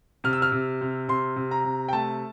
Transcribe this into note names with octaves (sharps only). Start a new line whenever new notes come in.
C3 F6
E6
F6
C3
C3
C3 C6
C3
A#5
C3
G5
A3 A5